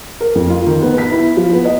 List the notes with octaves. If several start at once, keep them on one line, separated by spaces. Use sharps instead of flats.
A#4
F2
F4
D#3
B3
B6
E4
F3
B3
D#5